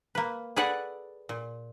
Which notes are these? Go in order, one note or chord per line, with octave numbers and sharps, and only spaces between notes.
A#3 B4
G#4 A4 B4 D5 F#5 G#5
A#2